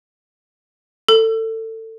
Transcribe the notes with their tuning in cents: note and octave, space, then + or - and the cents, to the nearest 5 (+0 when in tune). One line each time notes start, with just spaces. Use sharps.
A4 +25